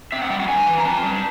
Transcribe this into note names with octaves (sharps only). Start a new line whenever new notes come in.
C4 E5
F#5
G3 G5
F#5
G2 G#5
E3
A#5
C4 A5
G3